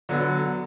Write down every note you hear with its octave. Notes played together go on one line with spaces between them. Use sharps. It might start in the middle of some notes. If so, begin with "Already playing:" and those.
D3 F#3 B3